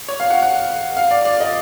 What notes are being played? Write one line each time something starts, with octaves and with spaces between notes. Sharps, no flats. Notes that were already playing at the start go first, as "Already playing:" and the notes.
C#5
F5
F#5
F#5
F5
D5
D5
D#5